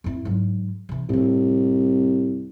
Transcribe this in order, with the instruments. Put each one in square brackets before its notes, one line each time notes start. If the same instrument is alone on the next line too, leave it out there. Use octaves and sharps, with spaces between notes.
[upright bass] F2 E4
G#2 F#3
C3 E3
[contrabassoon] C2 [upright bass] F2 A2